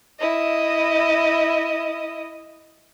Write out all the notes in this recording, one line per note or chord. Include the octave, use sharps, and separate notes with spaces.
E4 D#5